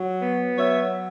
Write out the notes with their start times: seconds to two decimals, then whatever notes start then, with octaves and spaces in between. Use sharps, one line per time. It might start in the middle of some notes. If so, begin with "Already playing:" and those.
Already playing: F#3
0.21 B3
0.58 F#3 C#5 E5